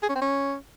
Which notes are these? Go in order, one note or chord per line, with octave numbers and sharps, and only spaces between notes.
G#4
C#4
C4
C#4